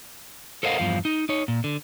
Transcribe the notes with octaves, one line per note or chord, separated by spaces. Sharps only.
A4 A#4 C5 D#5 F5 F#5
E2 G2 F3 F5
D#4
D#4 C#5
A#2
D3